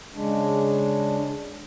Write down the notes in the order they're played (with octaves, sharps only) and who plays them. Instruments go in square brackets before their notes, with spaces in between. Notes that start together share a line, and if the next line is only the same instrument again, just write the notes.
[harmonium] C#3 G#3 D4